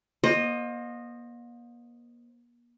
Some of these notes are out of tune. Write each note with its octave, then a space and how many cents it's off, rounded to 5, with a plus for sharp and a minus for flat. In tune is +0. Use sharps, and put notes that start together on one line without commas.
A#3 +40 C5 +25 D#5 -10